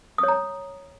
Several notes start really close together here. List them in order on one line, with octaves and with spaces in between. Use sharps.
D#6 C#5 A#5